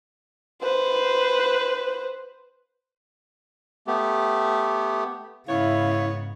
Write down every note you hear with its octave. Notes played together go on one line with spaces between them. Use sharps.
B4 C5
A3 B3 G4
G#2 C#3 B3 E4 C#5 E5 F5